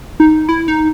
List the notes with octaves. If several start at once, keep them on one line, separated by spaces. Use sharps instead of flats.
D#4
E4
D#4